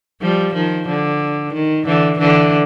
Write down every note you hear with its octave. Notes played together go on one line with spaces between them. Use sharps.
F3 G3
D#3 F3
D3
D#3
D3 E3
D3 E3